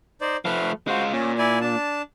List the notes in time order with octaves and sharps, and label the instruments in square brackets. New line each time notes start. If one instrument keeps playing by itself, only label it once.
[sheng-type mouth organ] D#4 C5 D5
[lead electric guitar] F3 A3 [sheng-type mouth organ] B4 F6
[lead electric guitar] G#3 F4 [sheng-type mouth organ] F#4 C5
[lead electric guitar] A#2 [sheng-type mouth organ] C#4
[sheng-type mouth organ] E4 D5 G#5
D4 A5